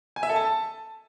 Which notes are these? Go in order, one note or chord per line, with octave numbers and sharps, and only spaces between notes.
G#5
E5
A4
A5